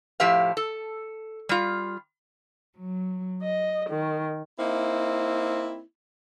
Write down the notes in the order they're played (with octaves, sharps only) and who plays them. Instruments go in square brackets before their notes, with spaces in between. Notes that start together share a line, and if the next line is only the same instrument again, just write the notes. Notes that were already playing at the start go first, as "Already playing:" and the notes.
[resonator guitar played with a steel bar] A2 F3 G4 E5 F5
A4
G3 F4
[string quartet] F#3
D#5
D#3
[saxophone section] A#3 C4 D#4 E4